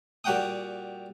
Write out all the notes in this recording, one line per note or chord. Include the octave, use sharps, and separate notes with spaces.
A#2 G3 F#4 F#5 G5 D#6